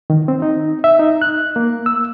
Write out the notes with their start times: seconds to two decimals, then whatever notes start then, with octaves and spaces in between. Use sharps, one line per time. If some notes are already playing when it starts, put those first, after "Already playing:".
0.10 D#3
0.28 C4
0.42 D#4
0.84 E5
0.99 D#4
1.22 F#6
1.56 A#3
1.86 E6